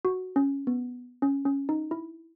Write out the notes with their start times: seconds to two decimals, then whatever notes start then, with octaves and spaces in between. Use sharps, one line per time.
0.05 F#4
0.36 C#4
0.67 B3
1.22 C#4
1.45 C#4
1.69 D#4
1.91 E4